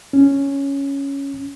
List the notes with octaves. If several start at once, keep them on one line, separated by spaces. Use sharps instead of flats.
C#4